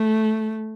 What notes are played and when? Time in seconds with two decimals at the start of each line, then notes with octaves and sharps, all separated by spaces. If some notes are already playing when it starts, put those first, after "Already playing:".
Already playing: A3